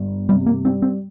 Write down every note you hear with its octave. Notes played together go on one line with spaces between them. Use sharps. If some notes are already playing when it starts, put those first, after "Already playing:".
Already playing: G1 G2
C3 G3
A#3
G3 C4
C4